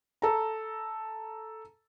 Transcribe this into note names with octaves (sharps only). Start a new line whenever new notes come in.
A4 A#5